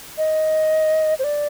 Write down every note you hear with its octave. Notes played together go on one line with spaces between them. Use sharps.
D#5
C5
D5